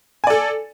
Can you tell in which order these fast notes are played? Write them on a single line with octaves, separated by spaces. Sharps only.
G#5 D5 A4